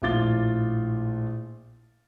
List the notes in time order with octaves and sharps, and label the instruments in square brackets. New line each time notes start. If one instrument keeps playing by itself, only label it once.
[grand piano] A#1 A2 F4 D6 A6 G7